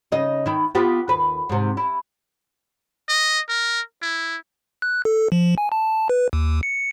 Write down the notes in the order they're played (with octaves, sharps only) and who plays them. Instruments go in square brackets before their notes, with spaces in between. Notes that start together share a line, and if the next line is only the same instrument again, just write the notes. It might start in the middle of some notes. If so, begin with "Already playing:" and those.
[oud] C#3 D#4 D#5
D#3 E4
B3 F4 G4
D#2 B4
G#2 C3
E4
[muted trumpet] D#5
A#4
E4
[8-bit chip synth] F#6
A4
F3
G#5
A5
B4
D#2
C#7